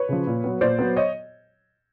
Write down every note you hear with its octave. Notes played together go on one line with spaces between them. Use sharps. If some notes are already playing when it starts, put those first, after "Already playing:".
Already playing: B4 C#5
C#3 F3
A#2
F#3 B3
A#2 C5 D5
F#3 B3
C#5 D#5